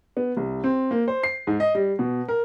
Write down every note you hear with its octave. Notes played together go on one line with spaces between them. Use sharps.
B3
C2
C4
A#3
C5
C7
G#2
D#5
G3
B2
A#4